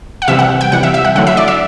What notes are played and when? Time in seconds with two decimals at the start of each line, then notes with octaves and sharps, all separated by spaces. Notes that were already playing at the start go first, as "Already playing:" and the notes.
0.22 F#5
0.28 C3 E3 G3 E5
0.39 F#5
0.61 G5
0.72 C3 E3 G3 F#5
0.83 E5
0.94 E5
1.05 F#5
1.15 D3 F#3 A3 E4 F#5
1.27 E5
1.37 D5
1.48 E5